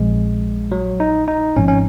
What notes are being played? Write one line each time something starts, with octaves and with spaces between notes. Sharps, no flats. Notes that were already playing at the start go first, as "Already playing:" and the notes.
Already playing: A#1 A#2 F3 G#3 C4
F#3
D#4
D#4
G#1 G#2 F3 C4 C#4
C#4